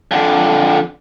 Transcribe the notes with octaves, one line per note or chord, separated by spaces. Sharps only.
F2 D3